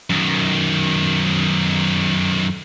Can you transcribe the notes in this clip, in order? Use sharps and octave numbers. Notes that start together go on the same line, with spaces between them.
F#2 D#3